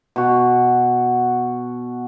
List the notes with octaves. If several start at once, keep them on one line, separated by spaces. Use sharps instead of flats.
B2 F#4